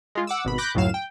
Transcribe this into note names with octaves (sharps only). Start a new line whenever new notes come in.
G#3 F4
F#5 D6 E6
G#1 B2 B5
B5 D6 F#6 G6 A#6
C#2 F#2 A2 F#3 F5 E7
G5